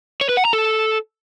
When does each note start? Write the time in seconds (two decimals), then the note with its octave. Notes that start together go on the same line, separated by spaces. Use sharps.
0.21 C#5
0.29 B4
0.37 F#5
0.45 A#5
0.53 A4